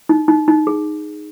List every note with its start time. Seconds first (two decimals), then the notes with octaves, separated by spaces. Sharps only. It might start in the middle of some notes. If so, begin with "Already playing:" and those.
0.09 D#4
0.28 D#4
0.48 D#4
0.67 G#4